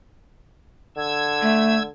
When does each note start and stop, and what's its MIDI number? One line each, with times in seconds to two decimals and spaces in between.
0.97 1.89 50
0.97 1.83 88
0.97 1.83 92
1.42 1.78 57